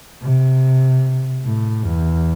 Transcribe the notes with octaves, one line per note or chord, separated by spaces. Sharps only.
C3
A2
E2